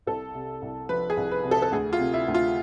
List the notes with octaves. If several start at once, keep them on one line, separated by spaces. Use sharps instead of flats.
C2 A4
C3
C2
F3 B4
G#4
C2
B4
C3
A4
A4
D2 G#4
F4
C3
E4
D2
F4